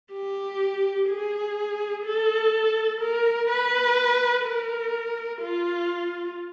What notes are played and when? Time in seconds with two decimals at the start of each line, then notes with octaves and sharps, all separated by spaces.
0.13 G4
1.09 G#4
2.05 A4
3.01 A#4
3.49 B4
4.46 A#4
5.42 F4